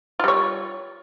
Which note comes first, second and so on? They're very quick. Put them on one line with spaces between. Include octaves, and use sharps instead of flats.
F4 G3 C#5